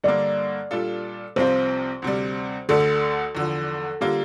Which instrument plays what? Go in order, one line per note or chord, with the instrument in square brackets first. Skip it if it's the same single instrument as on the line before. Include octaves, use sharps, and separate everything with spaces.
[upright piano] G2 D3 G3 A#3 [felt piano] D5
[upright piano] A#2 G3 D4 F4 A4
[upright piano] C2 C3 F3 C4 F4 [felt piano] C5
[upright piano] D2 C3 G3
[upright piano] D2 D3 A3 D4 [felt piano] A4
[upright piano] E2 D3 F3
[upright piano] D3 G3 A#3 F4 [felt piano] G4